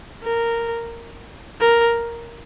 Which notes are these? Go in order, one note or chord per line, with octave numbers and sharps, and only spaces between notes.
A#4
A#4